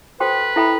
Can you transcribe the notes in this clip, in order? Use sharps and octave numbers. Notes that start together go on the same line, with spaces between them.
F#4 A4 B4 C5 G5 C6
E4 A4 E5 G5 B5